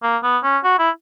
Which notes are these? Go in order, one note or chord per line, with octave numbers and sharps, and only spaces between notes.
A#3
B3
C#4
F#4
E4